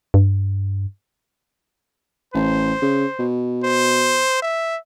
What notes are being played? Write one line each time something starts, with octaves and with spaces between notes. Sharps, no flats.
G2
A1 C5
C#3
B2
C5
E5